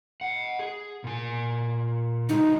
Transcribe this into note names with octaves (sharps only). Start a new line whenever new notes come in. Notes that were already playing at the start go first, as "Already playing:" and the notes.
D#5 F#5
G#4
A#2 G#5
D3 F#3 G#3 D#4